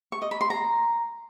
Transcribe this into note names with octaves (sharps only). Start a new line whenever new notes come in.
C#6
D#5
B5
C6
A#5